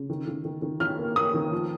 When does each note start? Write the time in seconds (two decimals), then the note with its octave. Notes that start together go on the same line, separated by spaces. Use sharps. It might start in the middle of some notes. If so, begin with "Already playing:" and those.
Already playing: C#3
0.10 D#3
0.27 D#3
0.45 D#3
0.62 D#3
0.80 D#3 F6
0.99 A#3
1.16 A#3 D#6
1.34 D#3
1.52 F3